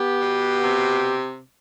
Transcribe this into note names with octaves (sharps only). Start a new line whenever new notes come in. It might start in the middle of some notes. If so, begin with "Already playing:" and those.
Already playing: B3 G4
B2
C3